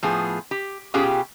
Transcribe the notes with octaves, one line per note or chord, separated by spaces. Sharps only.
A2 F3 B3 G#4
G4
B2 C#4 F4 G4 G#4 G5